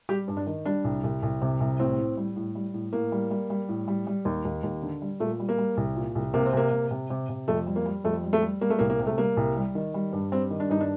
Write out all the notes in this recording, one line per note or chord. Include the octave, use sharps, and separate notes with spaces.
G3 G4
G2
D4
D#3
G3 D4
C2
C2
C2
C3
C2
A2 C4
A2
G3
A2
G3
A2
A2 A#3
G3
G3
G3
A2
G3
G3
D#2
D#2
D#2
D3
G3
A#2 A3
G3
A#3
G3
C2
A#2
C2
C3 A#3
C4
C3 A#3
C3
C3
C3
C3
F2 A3
G3
A#3
G3
F2 A3
G3
A3
G3
G3 A#3
A3
C2 A#3
A#3
C3
A3
G3 A#3
C2
G3
D#3
G3
G2
G3 C4
D#3
D4
G2 D#4
D4